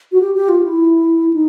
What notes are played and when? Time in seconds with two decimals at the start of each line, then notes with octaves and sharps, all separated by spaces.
0.12 F#4
0.20 G4
0.35 G4
0.49 F4
0.63 E4
1.33 D#4